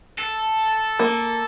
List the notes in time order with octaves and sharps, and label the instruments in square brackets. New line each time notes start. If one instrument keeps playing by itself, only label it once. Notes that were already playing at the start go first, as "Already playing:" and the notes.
[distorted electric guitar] A4
[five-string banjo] A#3